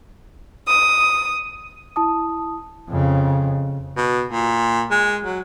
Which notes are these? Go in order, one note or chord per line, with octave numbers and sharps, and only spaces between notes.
D#6
E4 A5 D#6
F2 C#3
B2
A#2
G#3
F#3